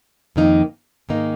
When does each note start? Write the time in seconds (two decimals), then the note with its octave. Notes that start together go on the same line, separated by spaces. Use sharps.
0.36 F2 D#3 A#3 D#4
1.09 G#2 D#3 A#3 D#4